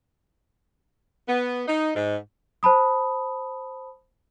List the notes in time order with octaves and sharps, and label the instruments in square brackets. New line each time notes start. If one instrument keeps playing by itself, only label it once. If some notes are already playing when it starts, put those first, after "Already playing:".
[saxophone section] B3
D#4
G#2
[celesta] C5 A5 B5 D#6